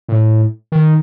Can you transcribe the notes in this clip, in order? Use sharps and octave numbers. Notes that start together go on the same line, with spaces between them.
A2
D#3